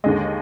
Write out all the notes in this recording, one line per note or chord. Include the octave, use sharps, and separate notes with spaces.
D#2 D3 G#3 D#5